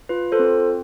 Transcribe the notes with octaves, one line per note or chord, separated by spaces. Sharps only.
F4 B4
A4 C5
C4